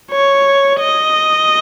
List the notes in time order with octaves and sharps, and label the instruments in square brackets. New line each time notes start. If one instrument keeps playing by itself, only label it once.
[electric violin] C#5
D#5